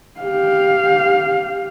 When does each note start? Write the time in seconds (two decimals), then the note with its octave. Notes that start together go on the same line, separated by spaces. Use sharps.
0.21 G4 F5